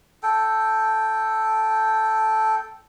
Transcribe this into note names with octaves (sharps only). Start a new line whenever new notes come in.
A4 G5